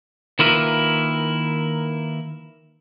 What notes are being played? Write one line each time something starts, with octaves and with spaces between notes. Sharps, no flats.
D#3 A#3 E4 F4 A#4 B4